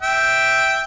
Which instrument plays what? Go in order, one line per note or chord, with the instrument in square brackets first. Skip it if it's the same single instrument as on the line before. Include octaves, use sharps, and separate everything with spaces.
[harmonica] E5 G5